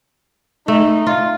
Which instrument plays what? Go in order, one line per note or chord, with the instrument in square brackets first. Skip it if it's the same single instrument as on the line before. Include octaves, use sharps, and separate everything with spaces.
[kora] A3 [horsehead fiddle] D#4
[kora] F4